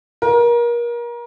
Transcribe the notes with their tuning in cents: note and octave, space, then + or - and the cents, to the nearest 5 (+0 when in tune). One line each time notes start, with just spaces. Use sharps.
A#4 +30